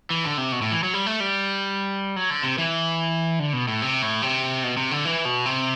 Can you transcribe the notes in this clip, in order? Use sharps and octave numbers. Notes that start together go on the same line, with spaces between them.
E3
D3
C3
B2
A2
E3
F#3
G3
A3
G3
F#3
D3
C3
E3
D3
B2
A2
C3
A2
C3
B2
C3
D3
E3
B2
C3